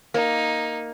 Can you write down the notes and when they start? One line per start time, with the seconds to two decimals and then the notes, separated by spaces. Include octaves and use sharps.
0.14 A#3 D#4